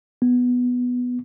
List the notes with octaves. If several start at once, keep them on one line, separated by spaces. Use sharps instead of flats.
B3